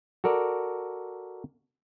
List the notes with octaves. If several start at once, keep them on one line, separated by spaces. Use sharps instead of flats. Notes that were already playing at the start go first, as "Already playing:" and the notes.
F#4 A4 A#4 D5